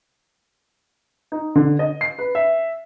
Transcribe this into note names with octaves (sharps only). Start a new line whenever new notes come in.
D#4
D3
D#5
C7
B4
E5